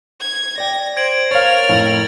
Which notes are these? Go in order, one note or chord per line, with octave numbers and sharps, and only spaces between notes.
G#6
D5 G5 A#6
C5 G#6 D7 F#7
A#4 C#5 F5 F6 A6
F2 A2 A6 D7 F#7